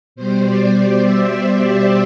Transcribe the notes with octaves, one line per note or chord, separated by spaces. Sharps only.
B2 G3 C5
D5
D5
E5
D5
G4